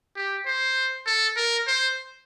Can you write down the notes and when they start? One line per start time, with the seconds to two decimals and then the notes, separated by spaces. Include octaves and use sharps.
0.16 G4
0.46 C5
1.06 A4
1.36 A#4
1.67 C5